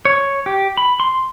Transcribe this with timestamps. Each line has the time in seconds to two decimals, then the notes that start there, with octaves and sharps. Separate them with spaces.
0.05 C#5
0.46 G4
0.77 B5
1.00 C6